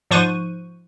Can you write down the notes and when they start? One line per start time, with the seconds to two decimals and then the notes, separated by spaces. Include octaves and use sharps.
0.11 G#2 F3 C5 C#6 F#6 D#7